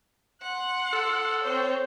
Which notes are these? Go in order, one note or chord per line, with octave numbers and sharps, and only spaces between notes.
F#5 C6 F#6
A4
C4 C5 C#5